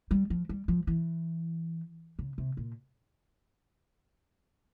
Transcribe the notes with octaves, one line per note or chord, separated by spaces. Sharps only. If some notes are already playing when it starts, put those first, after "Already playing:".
G3
F3
G3
F3
E3
C#3
C3
A#2